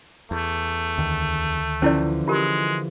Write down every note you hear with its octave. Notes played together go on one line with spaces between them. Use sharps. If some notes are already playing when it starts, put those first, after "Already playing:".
E2 A3
D2 D#3
D3 E3 F3 C#4 E4 D5
G#3 F4 G4 A#4